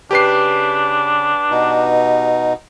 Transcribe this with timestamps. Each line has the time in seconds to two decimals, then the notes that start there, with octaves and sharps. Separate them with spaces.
0.11 C#3 D4 G4 B4 C7
1.50 B2 D#4